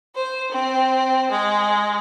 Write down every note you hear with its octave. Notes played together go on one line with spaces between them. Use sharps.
C5
C4
G#3